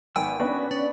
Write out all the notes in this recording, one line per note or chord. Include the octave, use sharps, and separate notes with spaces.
G#1 B3 G5 G#5 E6
B3 C#4 D4 F#4 B5
C#4 D5